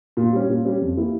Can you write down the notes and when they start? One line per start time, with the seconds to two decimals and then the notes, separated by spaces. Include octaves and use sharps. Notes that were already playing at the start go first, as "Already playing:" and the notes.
0.17 A#2
0.33 G3 C#4
0.49 A#2
0.65 G3 C#4
0.81 F2
0.97 E3 A#3 E4 G4